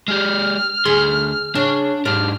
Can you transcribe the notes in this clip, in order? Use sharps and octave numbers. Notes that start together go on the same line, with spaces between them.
G#3 G4 F6
D2 G#4 C6
C#3 D4
G#2 D4 G4 F6